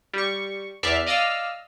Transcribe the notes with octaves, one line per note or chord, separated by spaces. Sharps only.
G3 C#6
E2 D5 E5 F6 F#6 C7
D5 D#5 F5 E6 F6